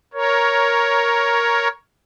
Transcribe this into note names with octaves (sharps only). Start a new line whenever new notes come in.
A#4 C#5